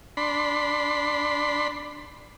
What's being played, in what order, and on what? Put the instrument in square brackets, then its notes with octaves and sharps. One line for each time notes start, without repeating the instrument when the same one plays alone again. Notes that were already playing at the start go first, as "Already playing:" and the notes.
[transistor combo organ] D4 B5 C6